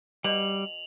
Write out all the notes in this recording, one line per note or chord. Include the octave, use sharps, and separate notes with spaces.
B2 G3 F7 F#7